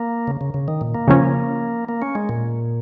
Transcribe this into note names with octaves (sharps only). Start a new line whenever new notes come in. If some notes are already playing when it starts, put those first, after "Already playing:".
Already playing: A#3
C#3
C#3
C#3
D#3
A#2
A#3
C#3 F3 C#4
A#3
C#4
G#3
A#2